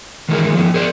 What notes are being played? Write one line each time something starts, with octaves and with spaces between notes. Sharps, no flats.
D#3 E3 G#3 E4 A#4
F3 B3
G#4 A#4 C5 D5